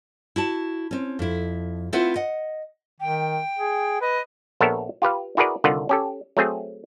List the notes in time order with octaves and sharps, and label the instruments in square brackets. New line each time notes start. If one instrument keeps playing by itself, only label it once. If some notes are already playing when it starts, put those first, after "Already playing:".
[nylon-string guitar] E4 F#4 A5
C4 C#4
F2 E4
A3 C4 E4 F4 B4 F#5
D#5 F#5
[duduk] D#3 [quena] G5
[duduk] G#4
[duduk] B4 [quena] D#5
[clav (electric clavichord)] A#1 B3 A4 A#4 C#5 E5
F4 G4 B4 F5
E4 F#4 G#4 A#4 B4 D5
C2 D3 D#3 F4 F#5
C#4 G4 A4
F#3 A3 C4 G#4